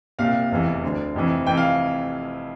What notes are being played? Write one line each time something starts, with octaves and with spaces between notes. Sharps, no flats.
C2 A#2 F5
F1 E2 E3
D2 D3
F1 F2 E3
F1 F2 E3 G5
F5